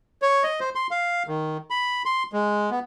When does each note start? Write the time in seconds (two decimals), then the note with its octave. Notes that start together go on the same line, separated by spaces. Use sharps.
0.22 C#5
0.44 D#5
0.60 C5
0.75 C6
0.91 F5
1.27 D#3
1.70 B5
2.05 C6
2.33 G#3
2.71 B3